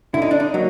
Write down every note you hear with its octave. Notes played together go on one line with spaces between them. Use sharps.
D3 E4
D#4
D4
D#4
F#3 A#3